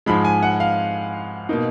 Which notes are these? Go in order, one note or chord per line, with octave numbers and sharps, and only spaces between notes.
G#2 F3 G#3 B5
G#5
F#5
F5
B2 A#3 D#4